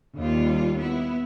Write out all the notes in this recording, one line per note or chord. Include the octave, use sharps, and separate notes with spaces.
D#2 G3 F4
B3 E4